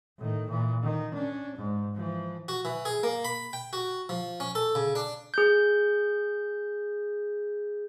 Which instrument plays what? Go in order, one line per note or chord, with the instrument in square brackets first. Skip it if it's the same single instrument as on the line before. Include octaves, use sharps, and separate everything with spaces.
[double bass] A2 D#3
A#2 E3
D#3
C#4 D4
G#2
E3 F3
[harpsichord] F#4
E3
G#4
A#3
B5
G5
F#4
F3
C#4
A4
C#3
D4
[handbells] G#4 G6